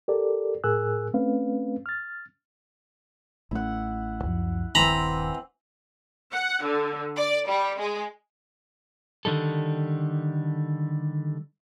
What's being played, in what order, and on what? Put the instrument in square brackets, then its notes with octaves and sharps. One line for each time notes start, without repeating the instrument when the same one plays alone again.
[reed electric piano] G4 A4 A#4 D5
A2 G#4 A#4 G#5 E6 F#6
A3 C4 C#4 B4 F5
F6 A6
[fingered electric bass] A1 A3 C#4 [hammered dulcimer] E4 F#5
[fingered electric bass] C#2 F#2 F3
[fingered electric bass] D#1 G2 D#3 [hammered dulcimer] E3 C4 [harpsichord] A#5 B5
[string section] F#5
D3
D5
G3
G#3
[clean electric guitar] D3 D#3 G3 A4